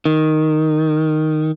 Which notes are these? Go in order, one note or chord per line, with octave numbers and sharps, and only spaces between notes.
D#3